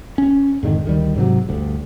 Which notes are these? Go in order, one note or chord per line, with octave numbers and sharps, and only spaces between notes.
C#4
F2 G#2 D3 D#3
D2 D#3 G3
G#2 C3 F#3
D2 G2